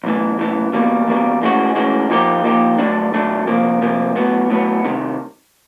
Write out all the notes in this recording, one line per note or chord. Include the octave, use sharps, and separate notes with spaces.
B1 A2 E3
B1 A2 E3
E2 B2 G3 A#3
E2 B2 G3 A#3
A2 E3 G#3 C#4 F#4
A2 E3 G#3 C#4 F#4
A#2 F3 A#3 D#4 G4
A#2 F3 A#3 D#4 G4
G2 D3 F#3 A3 D4
G2 D3 F#3 A3 D4
C2 C3 F3 A#3
C2 C3 F3 A#3
A2 F#3 B3
A2 F#3 B3
C2 C3 D#3